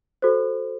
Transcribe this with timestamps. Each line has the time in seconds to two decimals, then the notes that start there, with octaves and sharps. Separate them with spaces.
0.22 F#4 A4 C5